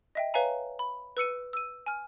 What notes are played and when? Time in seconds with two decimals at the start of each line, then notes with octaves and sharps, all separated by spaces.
0.15 D#5 E5 G5
0.34 B4 C#5 E5 F5 G#5 A#5
0.79 B5
1.17 B4 E6 C#7 D#7
1.53 E6 D#7
1.86 G#5 F6